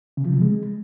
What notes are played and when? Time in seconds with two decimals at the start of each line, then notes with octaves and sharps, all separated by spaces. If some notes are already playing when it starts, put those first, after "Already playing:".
0.17 C#3
0.25 F3
0.34 C3
0.42 G#3